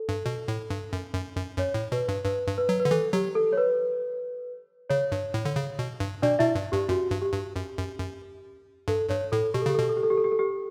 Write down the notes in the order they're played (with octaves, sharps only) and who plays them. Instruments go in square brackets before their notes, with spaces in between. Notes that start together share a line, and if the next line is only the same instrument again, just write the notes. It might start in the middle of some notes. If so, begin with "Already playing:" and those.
Already playing: [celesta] A4
[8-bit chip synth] G2
B2
A2
G2
F#2
F#2
F#2
[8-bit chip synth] F#2 [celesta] C#5
[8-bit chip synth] A2
[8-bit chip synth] B2 [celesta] B4
[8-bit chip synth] G2
[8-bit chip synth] G2 [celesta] B4
[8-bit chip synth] G2
[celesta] B4
[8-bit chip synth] F#3
[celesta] B4
[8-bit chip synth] D3
[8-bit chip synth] E3 [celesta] A4
[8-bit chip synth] F#3 [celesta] G4
[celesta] A4
C#5
B4
[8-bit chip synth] C#3 [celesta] C#5
[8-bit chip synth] G2
A2
D3
C#3
B2
G2
[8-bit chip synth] B2 [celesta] D4 D5
[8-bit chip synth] B2 [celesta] E4 E5
[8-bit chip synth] G2
[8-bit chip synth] G2 [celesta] G4
[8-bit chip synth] F#2 [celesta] F#4
[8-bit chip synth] G2
[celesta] G4
[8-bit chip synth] G2
F#2
F#2
F#2
[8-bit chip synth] G2 [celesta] A4
[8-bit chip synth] G2 [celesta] C#5
[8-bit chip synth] A2 [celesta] A4
[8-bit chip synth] B2 [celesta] G4
[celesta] A4
[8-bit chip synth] C#3 [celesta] G4
[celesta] A4
[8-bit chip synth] B2 [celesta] G4
[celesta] A4
G4
A4
G4
A4
G4
A4
G4